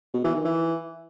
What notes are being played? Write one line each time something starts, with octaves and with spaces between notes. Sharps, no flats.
B2
E3
D#3
E3